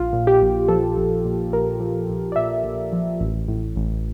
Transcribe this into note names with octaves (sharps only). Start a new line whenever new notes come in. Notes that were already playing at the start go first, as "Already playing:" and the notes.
Already playing: A#1 F4
A#2
G4
A#1
F3 A4
A#1
A#2
A#1 A#4
F3
A#1
D5
A#2 E5
A#1
F3
A1
A2
A1